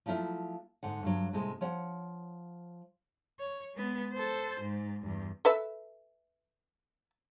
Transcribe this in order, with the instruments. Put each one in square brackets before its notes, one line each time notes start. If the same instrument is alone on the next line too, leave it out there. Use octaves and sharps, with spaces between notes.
[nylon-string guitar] F3 F#3 A3 E4 F4
G#2 D3 F#5
G2 D3 F#3
A2 C3 G#3
F3 C#5 F#5 G5
[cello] C#5
G#3 B3
A4 C5
G#2
E2 G2
[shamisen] A4 B4 E5